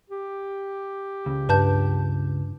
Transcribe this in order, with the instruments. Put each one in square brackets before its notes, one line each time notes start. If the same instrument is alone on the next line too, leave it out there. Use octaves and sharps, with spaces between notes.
[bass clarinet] G4
[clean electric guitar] C#2
[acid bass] G2 [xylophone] B4 A5 G6